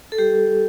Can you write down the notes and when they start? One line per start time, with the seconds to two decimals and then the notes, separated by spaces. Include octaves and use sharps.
0.12 A4
0.18 G3 G4